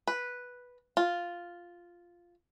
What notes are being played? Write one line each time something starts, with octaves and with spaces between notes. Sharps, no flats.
B4
F4